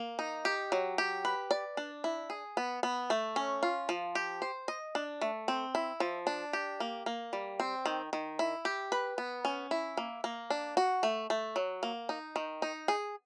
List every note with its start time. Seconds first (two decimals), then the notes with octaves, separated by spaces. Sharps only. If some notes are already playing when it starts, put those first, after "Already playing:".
Already playing: A#3
0.19 D#4
0.45 G4
0.72 F#3
0.98 G4
1.25 B4
1.51 D5
1.77 D4
2.04 E4
2.30 G#4
2.57 B3
2.83 B3
3.10 A3
3.36 C#4
3.63 F4
3.89 F3
4.15 G4
4.42 C5
4.68 D#5
4.95 D4
5.21 A3
5.48 C4
5.75 E4
6.00 F3
6.27 D4
6.53 G4
6.80 A#3
7.06 A#3
7.33 G3
7.60 C4
7.86 D#3
8.13 D#3
8.39 E4
8.65 G4
8.92 B4
9.18 B3
9.45 C#4
9.71 E4
9.97 A#3
10.24 A#3
10.50 D4
10.77 F#4
11.03 A3
11.30 A3
11.56 F#3
11.83 A#3
12.09 D#4
12.36 D#3
12.62 D#4
12.88 G#4